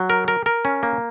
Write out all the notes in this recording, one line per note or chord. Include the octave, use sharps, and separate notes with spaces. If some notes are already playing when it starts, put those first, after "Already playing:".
Already playing: F#3
A#4
A#4
A#4
C#4
A#3